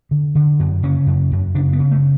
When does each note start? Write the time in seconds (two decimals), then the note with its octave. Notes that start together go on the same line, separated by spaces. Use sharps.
0.11 D3
0.35 D3
0.59 F#2
0.83 C#3 C#4
1.06 F#2
1.32 F#2
1.54 C#3 D4
1.73 B3
1.79 C#3
1.91 A3